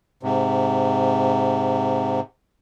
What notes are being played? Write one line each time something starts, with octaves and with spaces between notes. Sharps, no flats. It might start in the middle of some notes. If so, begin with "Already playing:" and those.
G#2 C3